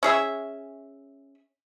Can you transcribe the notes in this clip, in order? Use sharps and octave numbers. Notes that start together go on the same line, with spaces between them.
C#4 G#4 E5